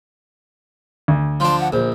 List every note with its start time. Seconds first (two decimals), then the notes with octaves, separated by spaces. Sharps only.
1.08 D2
1.40 F3 D4 C6
1.60 F#5
1.72 A#1 C5